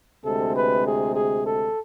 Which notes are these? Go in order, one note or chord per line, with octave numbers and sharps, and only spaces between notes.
D2 C3 G#3 A4
B4
G#4
G#4
A4